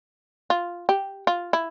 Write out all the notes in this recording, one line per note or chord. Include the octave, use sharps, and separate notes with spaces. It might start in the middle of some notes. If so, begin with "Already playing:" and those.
F4
G4
F4
E4